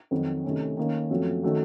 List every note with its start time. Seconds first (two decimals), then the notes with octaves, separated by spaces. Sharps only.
0.11 F2 D#3 F#3 C4 F#4
0.44 C3 D#3 A3 C#4
0.77 D#3 A#3 C#4
1.10 F#2 F3 A3 C4 F#4
1.43 D#3 A3 C#4 F#4